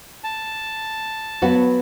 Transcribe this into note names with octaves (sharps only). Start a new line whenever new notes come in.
A5
F#3 B3 F#4